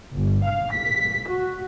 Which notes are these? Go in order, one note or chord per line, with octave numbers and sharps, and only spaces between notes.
G1
F5
B6
F#4